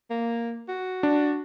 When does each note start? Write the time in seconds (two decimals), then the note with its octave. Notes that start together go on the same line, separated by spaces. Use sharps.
0.10 A#3
0.69 F#4
1.03 D4